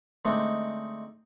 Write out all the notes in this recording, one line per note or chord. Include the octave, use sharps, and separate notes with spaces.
D3 G#3 A3 C4 D4 D#4